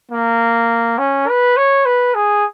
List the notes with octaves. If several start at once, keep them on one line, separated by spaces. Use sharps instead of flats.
A#3
C#4
B4
C#5
B4
G#4